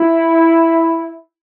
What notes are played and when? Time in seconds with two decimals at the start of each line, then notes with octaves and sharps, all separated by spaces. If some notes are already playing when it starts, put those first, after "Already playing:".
Already playing: E4